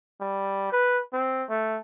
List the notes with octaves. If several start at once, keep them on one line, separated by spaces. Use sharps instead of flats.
G3
B4
C4
A3